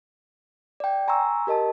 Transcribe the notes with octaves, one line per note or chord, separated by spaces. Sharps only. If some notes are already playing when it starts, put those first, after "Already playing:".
D5 G5
G#5 A#5 C6 C#6 E6
G4 A#4 D#5 A5